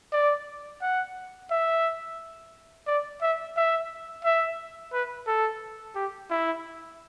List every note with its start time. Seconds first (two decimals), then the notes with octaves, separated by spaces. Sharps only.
0.13 D5
0.82 F#5
1.51 E5
2.87 D5
3.22 E5
3.57 E5
4.24 E5
4.93 B4
5.27 A4
5.95 G4
6.31 E4